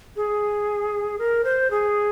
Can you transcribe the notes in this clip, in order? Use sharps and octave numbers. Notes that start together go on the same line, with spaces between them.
G#4
A#4
C5
G#4